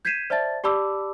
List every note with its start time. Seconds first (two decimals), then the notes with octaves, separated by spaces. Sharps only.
0.05 G6 G#6 B6 C7 D#7 E7
0.30 C5 D5 E5 A5 A6
0.64 G4 D5 A5 B5 D6 E6